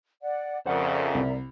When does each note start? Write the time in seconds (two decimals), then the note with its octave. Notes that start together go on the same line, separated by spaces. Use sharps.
0.22 D5 F#5
0.66 F2 C#3 A#4 C5 D5 E5 F#5
1.15 C2